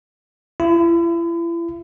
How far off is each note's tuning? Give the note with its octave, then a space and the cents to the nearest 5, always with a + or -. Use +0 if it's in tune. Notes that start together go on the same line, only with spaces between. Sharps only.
E4 +40